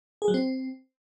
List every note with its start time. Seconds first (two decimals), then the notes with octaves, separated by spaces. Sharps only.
0.22 G#4
0.28 F#3
0.34 C4